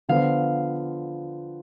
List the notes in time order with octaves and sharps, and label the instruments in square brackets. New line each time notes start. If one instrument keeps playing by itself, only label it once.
[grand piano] D3 F3 B3 F4 C5 [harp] F5